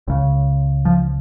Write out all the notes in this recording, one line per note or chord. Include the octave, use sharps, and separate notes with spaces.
C#2 C#3
F3